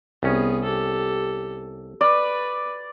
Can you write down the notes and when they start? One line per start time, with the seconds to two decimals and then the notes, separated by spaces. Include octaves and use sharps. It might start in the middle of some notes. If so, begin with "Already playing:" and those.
0.23 C2 B3 C#4 G#4
0.64 G4 A4
2.01 B4 D5